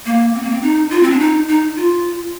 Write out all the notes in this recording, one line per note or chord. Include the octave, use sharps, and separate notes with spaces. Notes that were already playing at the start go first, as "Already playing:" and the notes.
A#3
C4
A#3
C4
D#4
F4
C4
D4
D#4
D#4
F4